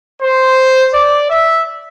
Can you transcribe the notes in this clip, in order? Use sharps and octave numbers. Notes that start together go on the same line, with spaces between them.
C5
D5
E5